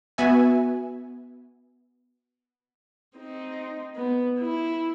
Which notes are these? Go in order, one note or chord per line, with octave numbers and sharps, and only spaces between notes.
B3 F#4 E5 G#5
C4 D#4
B3
E4